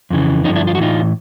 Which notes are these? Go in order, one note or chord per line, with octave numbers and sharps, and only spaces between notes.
F2 C#3 E3
G2 D3 F3 C#4 D#4
D4 E4
F4
F#4
A2 E3 D#4 F4